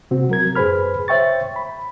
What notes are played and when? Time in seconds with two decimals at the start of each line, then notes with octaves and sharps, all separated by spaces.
0.11 C3 C4 F#4
0.30 F#3 A#4 G#6
0.56 F#2 G#4 B4 C5 B5 F6
1.08 C5 C#5 E5 G5 C#6 A6
1.56 B5